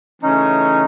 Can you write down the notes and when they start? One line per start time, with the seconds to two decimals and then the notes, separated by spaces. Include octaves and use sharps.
0.22 C#3 E3 A3 C#4 D#4